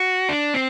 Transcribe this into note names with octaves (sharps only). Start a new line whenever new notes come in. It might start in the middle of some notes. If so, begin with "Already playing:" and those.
Already playing: F#4
D4
C4